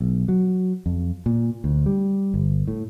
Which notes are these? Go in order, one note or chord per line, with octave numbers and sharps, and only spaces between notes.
B1
F#3
F2
A#2
D2
G3
G1
A2